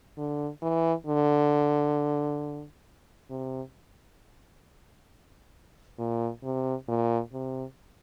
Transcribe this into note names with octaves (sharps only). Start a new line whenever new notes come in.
D3
E3
D3
C3
A#2
C3
A#2
C3